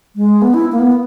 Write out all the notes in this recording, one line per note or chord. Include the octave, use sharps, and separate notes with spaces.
G#3
B3
E4
A#3
B3